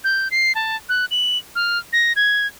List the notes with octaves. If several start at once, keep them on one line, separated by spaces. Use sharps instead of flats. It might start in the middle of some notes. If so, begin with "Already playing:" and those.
G6
C7
A5
F#6
F#7
F6
A#6
G#6